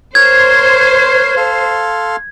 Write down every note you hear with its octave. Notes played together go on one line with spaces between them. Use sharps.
A#4 C5 C#5 G#6
A4 F5 C6